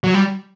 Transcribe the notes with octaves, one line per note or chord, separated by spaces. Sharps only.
F#3
G3